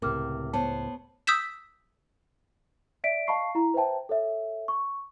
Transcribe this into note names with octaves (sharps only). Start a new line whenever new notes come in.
C#2 A2 C3 A#4 D6 F6
B3 C5 C#5 A5
D#6 E6 G6 B6 E7
D5 E5 B6 D7
D#5 F5 A5 B5 C#6 C7
E4 A#5
B4 C5 E5 G5 A5
A4 C#5 E5
C#6